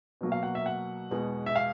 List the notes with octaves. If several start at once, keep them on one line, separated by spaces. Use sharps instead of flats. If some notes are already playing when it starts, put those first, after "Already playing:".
B2 F#3 A#3
F5
F#5
E5
F#5
E2 B2 G#3
E5
F5